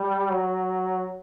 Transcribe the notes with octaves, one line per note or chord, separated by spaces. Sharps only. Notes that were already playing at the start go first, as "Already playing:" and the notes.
Already playing: G3
F#3